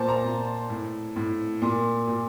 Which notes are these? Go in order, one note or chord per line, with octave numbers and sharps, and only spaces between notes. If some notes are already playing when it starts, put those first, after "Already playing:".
Already playing: A#2 C5 A5
A#5
A#2
A2
A2
A#2
A#2